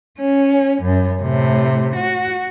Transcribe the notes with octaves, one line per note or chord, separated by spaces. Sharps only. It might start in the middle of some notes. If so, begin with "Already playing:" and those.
C#4
F#2
A2 C3
F#4